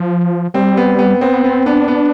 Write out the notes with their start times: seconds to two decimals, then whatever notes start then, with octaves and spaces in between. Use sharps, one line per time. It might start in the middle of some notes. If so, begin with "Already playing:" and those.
Already playing: F3
0.54 G3 C4
0.77 B3
0.99 B3
1.21 B3 C4
1.44 B3 C4
1.66 B3 D4
1.88 B3